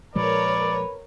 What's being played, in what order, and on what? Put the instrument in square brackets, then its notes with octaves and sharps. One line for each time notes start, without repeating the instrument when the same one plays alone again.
[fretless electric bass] A#2 F3 G#3 [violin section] A#4 C#5 [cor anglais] B4 [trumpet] D5